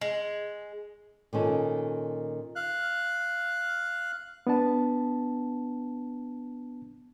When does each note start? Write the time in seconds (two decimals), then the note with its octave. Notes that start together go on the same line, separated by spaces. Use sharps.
0.01 G#3
1.33 A#2 D#3 C#4 A4
2.56 F5 F#6
4.47 B3 D4 A5